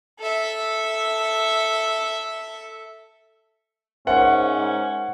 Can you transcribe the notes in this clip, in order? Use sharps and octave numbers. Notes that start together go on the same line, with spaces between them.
A4 E5
G#2 C#4 A#4 C5 E5 F#5